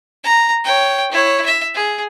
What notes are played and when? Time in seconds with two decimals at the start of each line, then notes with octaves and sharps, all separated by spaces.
0.23 A#5
0.64 C#5 G5
1.12 E4 C#5
1.46 E5
1.74 G#4